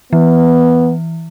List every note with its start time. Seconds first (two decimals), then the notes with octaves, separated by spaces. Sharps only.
0.13 E3 B3